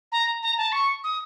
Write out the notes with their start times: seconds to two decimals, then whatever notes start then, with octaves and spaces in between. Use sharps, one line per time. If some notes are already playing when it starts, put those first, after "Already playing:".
0.12 A#5
0.43 A#5
0.58 A5
0.72 C#6
1.04 D#6